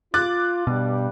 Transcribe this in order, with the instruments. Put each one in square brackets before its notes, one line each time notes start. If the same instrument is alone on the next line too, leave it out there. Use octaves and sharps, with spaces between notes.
[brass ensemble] F4 [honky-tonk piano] D6 F#6 A6
[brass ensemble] G2 G3 [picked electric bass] B2